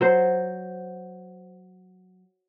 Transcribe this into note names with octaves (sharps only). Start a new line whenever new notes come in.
F#3 C5